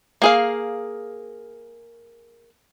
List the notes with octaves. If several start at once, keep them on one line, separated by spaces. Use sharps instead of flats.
A#3 G#4 F5